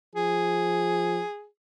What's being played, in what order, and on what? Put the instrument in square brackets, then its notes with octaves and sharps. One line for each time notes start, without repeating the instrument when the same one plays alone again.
[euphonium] F3 [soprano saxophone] G#4